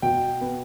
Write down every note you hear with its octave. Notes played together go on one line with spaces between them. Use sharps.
B2 G5
B3